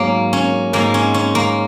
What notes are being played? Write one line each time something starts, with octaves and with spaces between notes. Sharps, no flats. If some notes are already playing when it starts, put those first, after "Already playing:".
Already playing: G#2 F#3 A#3 C#4
C#4
G#2 G#3 A#3
C#4
C#4
A#3